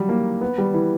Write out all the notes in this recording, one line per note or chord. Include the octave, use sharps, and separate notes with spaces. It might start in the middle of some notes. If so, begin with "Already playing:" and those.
Already playing: F#3 G3
A#3
B3
G3
E3